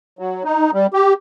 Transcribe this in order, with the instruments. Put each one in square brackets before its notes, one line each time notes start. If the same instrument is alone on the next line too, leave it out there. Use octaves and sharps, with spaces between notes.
[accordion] F#3
D#4
G3
G4